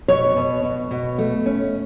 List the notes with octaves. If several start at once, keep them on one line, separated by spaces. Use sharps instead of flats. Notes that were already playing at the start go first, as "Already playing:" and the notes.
B2 C#5
B2
B2
B2
A3
C#4